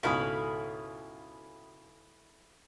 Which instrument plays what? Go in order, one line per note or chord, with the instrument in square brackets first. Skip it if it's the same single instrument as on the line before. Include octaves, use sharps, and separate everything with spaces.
[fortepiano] C#2 G#2 B2 [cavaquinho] E4 F5 B5 [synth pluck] A4 D#6